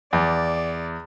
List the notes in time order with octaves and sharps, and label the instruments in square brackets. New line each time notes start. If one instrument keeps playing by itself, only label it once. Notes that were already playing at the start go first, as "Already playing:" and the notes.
[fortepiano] E2 [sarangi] D5